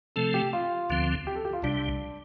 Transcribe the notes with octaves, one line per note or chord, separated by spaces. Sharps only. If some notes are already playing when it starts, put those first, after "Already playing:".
C3 F3 A3 C4 A4
G4
F4
D2 D3 F3 C4
G4
A4
G4
F4
C2 C3 G3 D4